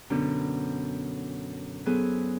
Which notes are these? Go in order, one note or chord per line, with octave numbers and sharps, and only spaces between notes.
F#2 B2 D3 D4
F#3 B3 E4 G#4 A4 C5